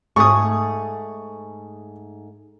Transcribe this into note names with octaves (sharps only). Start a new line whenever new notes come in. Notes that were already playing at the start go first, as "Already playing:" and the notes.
G#2 A3 G#4 C#6 D#6